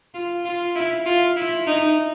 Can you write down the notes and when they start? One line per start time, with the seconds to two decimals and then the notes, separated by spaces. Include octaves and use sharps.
0.14 F4
0.45 F4
0.75 E4
1.06 F4
1.36 E4
1.67 D#4